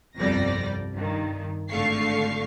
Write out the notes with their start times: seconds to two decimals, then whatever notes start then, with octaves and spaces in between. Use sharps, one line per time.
0.18 G1 C2 F2 G3 D5 A#6
0.94 G2 D#3
1.70 G#1 D3 A3 F5 C#6 C7